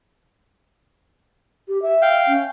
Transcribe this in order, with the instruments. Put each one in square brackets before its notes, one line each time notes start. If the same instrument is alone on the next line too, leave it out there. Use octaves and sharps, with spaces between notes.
[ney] G4
E5
[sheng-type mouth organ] F5 G5
[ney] C#4